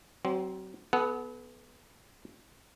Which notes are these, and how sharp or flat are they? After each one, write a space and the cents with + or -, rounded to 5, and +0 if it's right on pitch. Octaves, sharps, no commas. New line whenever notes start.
F#3 +35 C4 +0
B3 +0 A4 -40 F#5 +0